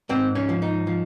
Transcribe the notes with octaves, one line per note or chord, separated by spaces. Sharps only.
G#2 C4
C#4
F3
D#4
F3